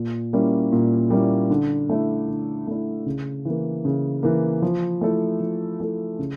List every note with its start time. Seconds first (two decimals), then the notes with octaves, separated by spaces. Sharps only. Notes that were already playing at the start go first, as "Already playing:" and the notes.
Already playing: A#2
0.33 G3 A#3 C#4 E4
0.72 A#2
1.10 G3 A#3 C#4 E4
1.50 D3
1.89 A3 E4
2.28 D3
2.67 A3 E4
3.06 C#3
3.45 E3 A#3
3.85 C#3
4.23 E3 A#3
4.62 F3
5.01 A3 E4 A4
5.40 F3
5.80 A3 E4 A4
6.19 C#3